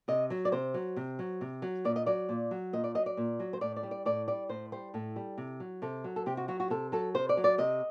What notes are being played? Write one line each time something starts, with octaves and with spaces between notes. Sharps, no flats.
C3 D#5
F#3
D5
C3 C5
F#3
C3
F#3
C3
F#3
A#2 D5
D#5
F#3 D5
A#2
F#3
A#2 D#5
D5
F#3 D#5
D5
A#2
F#3
C5
A2 D5
D5
G3
D5
A2 D5
G3 D5
A2 C5
G3 C5
A2 A4
G3
C3
F#3
C3 A4
F#3
A4
C3 G4
F#4
F#3 F#4
F#4
C3 A4
F#3 A4
C3 C5
D5
F#3
D5
C3 D#5